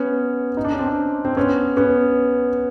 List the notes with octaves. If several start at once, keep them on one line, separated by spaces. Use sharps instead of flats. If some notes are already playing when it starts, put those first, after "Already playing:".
Already playing: B3 C#4
D#4
D4
C#4
C4 D4
C4
B3 C#4
B3 C#4